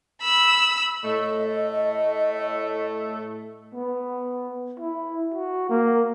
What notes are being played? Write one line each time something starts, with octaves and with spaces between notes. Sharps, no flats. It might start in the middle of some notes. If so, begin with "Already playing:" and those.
B5 E6
A2 A3 D#5
B3
E4
F#4
A#3